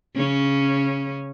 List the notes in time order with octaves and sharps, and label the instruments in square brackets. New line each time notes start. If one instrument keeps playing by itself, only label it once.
[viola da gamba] C#3 C#4